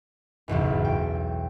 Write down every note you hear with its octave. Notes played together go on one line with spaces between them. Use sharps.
F#1 B1 E2 G#2
G5